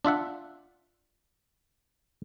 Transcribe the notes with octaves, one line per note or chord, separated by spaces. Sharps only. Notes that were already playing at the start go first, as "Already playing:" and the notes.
D4 F4 E5 F#5